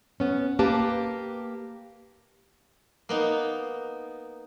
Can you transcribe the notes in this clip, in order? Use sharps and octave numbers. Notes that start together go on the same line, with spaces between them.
B3 C#4
A#3 G4 B4 A5
A#3 B3 D#4